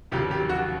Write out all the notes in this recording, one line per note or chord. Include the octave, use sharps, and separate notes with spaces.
F1 D#2 C#3 F#3 G4
G4
F#4